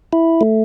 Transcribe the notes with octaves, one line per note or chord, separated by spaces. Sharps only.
E4
A3